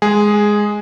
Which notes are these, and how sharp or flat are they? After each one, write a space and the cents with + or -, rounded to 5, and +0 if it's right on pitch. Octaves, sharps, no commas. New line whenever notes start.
G#3 +0 G#4 +0